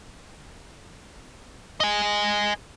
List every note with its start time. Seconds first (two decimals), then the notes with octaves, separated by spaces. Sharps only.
1.80 D#5 G#5